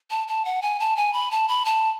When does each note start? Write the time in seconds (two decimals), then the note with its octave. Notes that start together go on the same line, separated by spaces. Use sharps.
0.10 A5
0.28 A5
0.45 F#5
0.62 G#5
0.80 A5
0.96 G#5
1.13 B5
1.31 A5
1.48 B5
1.65 A5